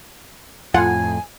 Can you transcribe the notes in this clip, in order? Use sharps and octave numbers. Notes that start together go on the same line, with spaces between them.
F2 A2 F4 F#5 G#5